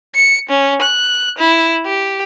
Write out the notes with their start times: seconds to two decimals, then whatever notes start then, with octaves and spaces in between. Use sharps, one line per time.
0.15 C#7
0.49 C#4
0.82 F#6
1.38 E4
1.86 G4